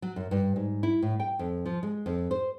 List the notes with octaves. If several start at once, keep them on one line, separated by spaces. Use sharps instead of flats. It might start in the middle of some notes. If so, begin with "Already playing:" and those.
F#3
F#2
G2
G#2
E4
A2
G5
F2
F3
G#3
F2
C5